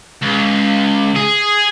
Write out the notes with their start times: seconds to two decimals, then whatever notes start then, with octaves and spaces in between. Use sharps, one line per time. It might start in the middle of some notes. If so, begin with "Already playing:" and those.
0.22 C#2
1.16 G#4